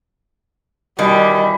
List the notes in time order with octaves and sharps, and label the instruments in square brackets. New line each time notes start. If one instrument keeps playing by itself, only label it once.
[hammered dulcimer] B2 E3 [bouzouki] D#3 [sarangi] G3